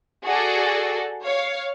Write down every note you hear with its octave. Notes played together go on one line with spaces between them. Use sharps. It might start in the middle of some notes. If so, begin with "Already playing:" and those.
F#4 G#4 A4 D5
C#5 F5